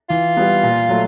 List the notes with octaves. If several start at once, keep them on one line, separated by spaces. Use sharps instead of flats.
E3 F4
G3 B3
A#2
F#3 A3